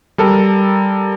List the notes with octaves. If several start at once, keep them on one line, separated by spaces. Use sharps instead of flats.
G3 A4 A#4